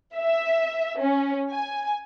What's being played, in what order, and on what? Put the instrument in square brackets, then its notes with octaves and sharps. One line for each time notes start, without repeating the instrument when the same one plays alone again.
[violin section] E5
C#4
G#5